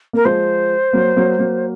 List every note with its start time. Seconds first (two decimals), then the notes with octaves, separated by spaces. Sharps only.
0.13 A#3 A#4
0.25 F3 G#3 C5
0.93 F#3 A#3
1.16 F#3 A#3
1.39 F#3 A#3